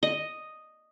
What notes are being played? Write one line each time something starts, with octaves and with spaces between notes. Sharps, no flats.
D#5